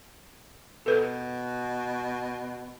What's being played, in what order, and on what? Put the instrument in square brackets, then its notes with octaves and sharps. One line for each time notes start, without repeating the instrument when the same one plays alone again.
[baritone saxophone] B2 [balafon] A4 B4